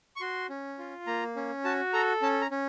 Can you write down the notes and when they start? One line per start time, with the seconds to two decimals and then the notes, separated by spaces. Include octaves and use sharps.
0.16 C#6
0.21 F#4 C6
0.49 C#4
0.79 F4
1.07 A#3 A#5
1.36 C#4
1.64 F#4 A5
1.93 A4 A#5
2.22 C#4 A5
2.41 A#5
2.51 C#4